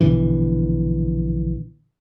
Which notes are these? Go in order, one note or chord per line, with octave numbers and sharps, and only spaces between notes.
A#1 B2 D3 E3